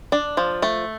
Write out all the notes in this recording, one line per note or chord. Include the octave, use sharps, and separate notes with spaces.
D4
F3
A3